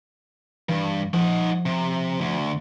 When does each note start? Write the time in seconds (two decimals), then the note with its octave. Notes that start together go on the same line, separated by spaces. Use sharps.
0.69 G2 E3
1.14 F3 D#4 F#5
1.66 C3
2.21 D2